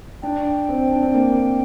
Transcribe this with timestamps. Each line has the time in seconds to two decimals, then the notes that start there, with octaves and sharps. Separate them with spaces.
0.22 D4 G5
0.69 C4
0.91 D4
1.03 C4
1.14 A#3